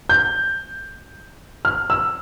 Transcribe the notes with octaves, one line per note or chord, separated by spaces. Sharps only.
G6
F6
E6